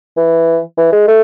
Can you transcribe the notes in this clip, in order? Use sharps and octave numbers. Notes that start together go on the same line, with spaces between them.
E3
E3
G#3
A3